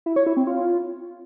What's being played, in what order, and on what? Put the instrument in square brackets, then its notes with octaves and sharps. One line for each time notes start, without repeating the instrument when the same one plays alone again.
[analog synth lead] E4
C#5
E4
C4
F4